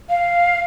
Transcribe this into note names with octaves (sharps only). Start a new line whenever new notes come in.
F5